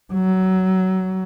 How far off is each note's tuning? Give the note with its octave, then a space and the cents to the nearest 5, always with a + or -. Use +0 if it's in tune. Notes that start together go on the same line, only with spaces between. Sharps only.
F#3 +20